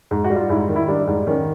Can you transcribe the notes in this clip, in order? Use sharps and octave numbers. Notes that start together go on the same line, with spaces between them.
G#2
F#4
G3
F4
G#2 E4
D#3
E4
G3 D4
G#2
D#3 C#4